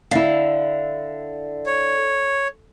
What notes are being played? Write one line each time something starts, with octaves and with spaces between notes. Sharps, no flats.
D3 E4 F5
C#5